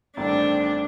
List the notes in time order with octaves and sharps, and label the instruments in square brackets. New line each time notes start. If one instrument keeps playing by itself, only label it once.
[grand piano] A1 G2 D#3 A3 C4 [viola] D4